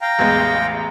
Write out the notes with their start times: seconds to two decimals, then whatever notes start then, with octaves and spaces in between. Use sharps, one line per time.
0.01 F5 G5 A#5
0.19 A1 E2 G#3